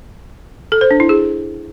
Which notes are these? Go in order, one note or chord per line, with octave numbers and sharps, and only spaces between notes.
A4
C5
D4
E4
G#4